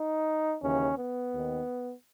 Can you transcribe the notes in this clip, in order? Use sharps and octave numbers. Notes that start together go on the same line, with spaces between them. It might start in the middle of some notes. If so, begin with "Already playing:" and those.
Already playing: D#4
D#2 C#3 E3 C#4
B3
D#2 D#3